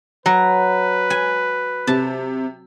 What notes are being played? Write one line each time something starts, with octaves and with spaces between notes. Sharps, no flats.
F#3 B4 A#5
G#5
C3 A5